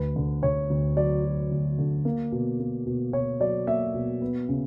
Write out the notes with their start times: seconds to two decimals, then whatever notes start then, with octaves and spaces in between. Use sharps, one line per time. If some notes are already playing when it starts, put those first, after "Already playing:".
Already playing: D2 B4
0.16 D3
0.43 D3 C#5
0.70 D2
0.96 F#3 D5
1.25 F#3
1.51 D2
1.78 D3
2.05 A#3
2.32 B2
2.60 A#3
2.86 B2
3.13 B2 C#5
3.40 F#3 D5
3.67 A#3 E5
3.94 B2
4.21 B3
4.49 C#3